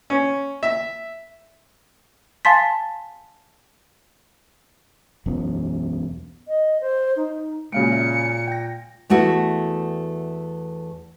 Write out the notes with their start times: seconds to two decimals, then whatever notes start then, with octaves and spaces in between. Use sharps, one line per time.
0.10 C#4
0.63 E5
2.45 F5 G#5 A5 C6 A6 B6
5.26 E1 B1 F#2 B3
6.48 D#5
6.80 C5
7.16 D#4
7.72 A#2 C#3 G#3 A#3 F#4 F5 C#7 D7
7.92 E5
8.48 G5 A#6
9.10 E2 A3 E4 F#4 B4